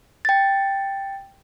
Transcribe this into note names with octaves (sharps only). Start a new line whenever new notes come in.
G5 A6